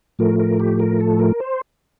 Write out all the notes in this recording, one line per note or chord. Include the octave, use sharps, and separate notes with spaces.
A2 F3 A3 A#4
A#4
G4
A#4
A4
A#4
C5